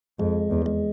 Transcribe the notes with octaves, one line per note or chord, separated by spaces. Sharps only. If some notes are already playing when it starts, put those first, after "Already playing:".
F2 G#3
E2
G#3